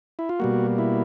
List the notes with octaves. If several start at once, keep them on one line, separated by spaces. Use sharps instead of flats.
E4
F4
B2 G3 A#3 F#4
E4